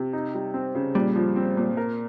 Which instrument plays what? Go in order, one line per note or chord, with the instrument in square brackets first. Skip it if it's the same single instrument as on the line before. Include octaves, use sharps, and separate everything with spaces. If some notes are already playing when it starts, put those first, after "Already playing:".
Already playing: [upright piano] C3
D#4
G3
C4
C#3
[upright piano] A#2 [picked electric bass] G3
[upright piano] F3
C4
A#2
A#4